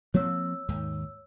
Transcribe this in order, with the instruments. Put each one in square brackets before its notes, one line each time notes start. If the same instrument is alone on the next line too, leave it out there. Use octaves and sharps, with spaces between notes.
[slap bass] F3 A#3 C4 [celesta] C#5 E6
[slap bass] D#2 G#2 D#3